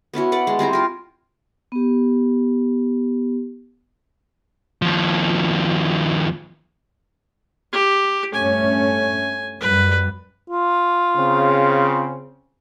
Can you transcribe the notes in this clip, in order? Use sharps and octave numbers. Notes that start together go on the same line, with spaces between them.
B3 C#4 E4 F#4
B4 D5 F#5
G#3
G3 C4 E4 A#5
F4 A#4
B3 G4
D#2 F3
G4
G2 A3 C#4 G#5
F#2 G3 B4
F4
C#3 C4